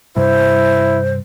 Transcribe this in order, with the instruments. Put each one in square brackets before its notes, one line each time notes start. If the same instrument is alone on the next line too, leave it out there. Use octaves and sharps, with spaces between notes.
[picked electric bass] G2 C3 G3 [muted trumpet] E4 [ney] C5